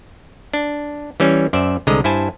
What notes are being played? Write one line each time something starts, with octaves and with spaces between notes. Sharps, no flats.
D4
E3 G3 C#4
F#2 C5 D5 E5
C2 D3 G#3 D#5 A#5
G2 E4 C5 G#5 A5